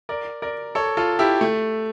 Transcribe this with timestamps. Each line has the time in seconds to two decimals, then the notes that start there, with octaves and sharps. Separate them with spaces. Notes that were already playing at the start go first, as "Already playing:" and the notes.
0.09 A#4 D5
0.42 A#4 D5
0.75 A4 C#5
0.97 F4 A4
1.19 E4 G4
1.41 A3